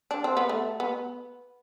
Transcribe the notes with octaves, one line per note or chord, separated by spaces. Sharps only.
D4
C4
B3
A3
B3